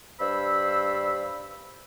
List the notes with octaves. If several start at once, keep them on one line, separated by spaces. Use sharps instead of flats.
G2 C5 B5 E6